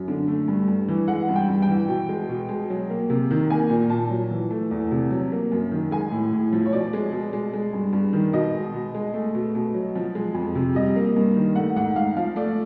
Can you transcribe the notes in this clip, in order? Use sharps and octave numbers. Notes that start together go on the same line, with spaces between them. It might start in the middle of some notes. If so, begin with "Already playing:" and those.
Already playing: F#2
D3
A3
G2
G2
E3
G#3 F#5
G2
G5
G2
G5
E3
B2
G#3
B2
G#3
F#3
A#3
C3
D#3
A#3 G#5
A#2
A#2 A5
F#3
E3
A3
E2
C3
F#3
A#3
F#2
D#3
G#3 G#5
A2
A2
F3
C#5
B2 D5
G#3
B2
G#3
G#3
G2
G2
D#3
B2 D#5
G#3
B2
G#3
A3
B2
B2
F#3
F3
G#3
F2
C3
G3 D#5
A#3
G2
D#3
A3 F#5
G#2 F#5
G#2 F5
F3 F5
A3 D5